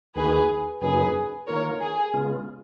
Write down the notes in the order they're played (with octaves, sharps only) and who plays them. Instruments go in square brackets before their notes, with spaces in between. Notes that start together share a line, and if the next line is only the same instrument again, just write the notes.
[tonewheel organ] D#2 D#3 A#3 D#4 F#4 [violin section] G#4 B4
[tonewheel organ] F#2 C#3 F#3 A#3 D#4 [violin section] G#4 B4
[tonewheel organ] D#3 A#3 F4 [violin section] A#4 C#5
[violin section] G#4
[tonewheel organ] C#3 G#3 B3 F4